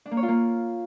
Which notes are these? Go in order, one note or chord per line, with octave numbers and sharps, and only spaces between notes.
D4
A#3
C#5
F4
A#3